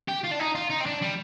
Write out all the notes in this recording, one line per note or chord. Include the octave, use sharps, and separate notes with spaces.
G4
F4
D4
D#4
F4
D#4
C4
D4
G3